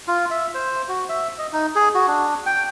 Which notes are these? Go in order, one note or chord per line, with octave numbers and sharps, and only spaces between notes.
F4
E5
C5
F#4
E5
D#5
D#4
G#4
F#4
D4
G5